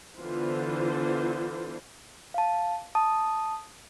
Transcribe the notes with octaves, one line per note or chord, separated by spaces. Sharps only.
D3 E3 B3 F4 C5
F5 A5
A5 D#6